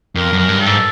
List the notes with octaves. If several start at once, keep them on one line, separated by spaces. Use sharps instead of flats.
F2 A#4
F#2
A#4
G2
A4
G#2